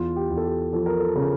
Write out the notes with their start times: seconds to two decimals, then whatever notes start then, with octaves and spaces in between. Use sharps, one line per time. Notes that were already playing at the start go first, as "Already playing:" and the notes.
Already playing: E2 F4
0.16 G4
0.30 E2
0.37 A4
0.44 G4
0.73 F3 A4
0.86 A#4
0.99 A4
1.16 C#3 A#4